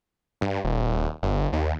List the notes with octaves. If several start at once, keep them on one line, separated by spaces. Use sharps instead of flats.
G2
D#1
G1
D#2